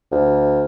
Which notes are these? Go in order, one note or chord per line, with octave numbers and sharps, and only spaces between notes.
D2